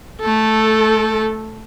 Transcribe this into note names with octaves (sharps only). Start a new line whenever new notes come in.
A3 A4